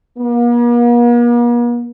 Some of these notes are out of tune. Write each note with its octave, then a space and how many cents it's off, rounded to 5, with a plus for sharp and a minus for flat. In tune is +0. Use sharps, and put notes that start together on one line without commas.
A#3 +45